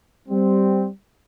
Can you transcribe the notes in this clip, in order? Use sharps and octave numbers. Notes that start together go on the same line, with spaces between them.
G3 C4